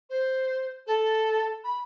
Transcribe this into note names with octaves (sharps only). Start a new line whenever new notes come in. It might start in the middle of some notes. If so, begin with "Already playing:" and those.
C5
A4
B5